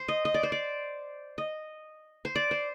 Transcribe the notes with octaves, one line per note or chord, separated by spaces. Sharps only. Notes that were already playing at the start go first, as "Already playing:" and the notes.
Already playing: C5
D#5
D#5
D5
C5
D5
D#5
C5
D5
C5